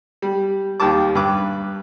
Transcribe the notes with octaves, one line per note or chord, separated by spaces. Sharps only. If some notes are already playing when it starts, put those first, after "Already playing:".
G3
D#2 D#3 G3 A5 D6
G2 B4 D6